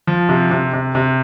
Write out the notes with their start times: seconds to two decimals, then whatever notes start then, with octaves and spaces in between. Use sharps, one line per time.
0.07 F3
0.29 C3
0.51 C3
0.73 C3
0.95 C3